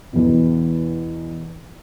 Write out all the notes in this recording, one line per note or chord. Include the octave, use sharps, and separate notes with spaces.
E2 B2